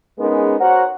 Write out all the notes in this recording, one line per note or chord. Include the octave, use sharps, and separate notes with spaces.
G#3 B3 C#4 D#4 G#4 A#4
F#4 A#4 C5 C#5 F#5